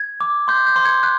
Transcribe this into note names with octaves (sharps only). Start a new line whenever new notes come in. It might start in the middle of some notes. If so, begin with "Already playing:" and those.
Already playing: G#6
D6
C6 G6
G6
C6
G#6
F#6